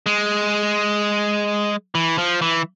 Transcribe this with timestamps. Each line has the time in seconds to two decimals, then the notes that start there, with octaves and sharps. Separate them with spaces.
0.06 G#3
1.95 E3
2.18 F3
2.42 E3